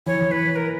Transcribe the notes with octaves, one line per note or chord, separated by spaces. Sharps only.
E3 C#5
E3
B4
A#4